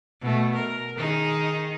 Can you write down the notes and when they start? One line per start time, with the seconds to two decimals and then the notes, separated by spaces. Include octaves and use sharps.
0.21 B2 A3
0.55 A#4
0.97 D#3 D#4 G#4